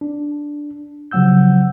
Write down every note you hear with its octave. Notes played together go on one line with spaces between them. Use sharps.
D4
C#3 F3 F#3 F#5 E6 G6